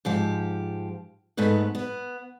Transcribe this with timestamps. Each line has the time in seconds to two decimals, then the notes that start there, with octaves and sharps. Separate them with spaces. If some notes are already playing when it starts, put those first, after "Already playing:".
0.05 G#2 F3 G4
1.37 G#2 A3 B3 B4
1.75 B3